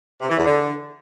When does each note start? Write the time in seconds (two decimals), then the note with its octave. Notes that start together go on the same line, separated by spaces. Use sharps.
0.21 C3
0.29 E3
0.37 E2
0.45 D3